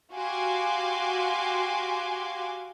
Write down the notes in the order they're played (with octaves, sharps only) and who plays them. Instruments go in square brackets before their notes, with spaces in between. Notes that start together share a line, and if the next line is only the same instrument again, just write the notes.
[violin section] F#4 G4 F5 G#5 C6 D6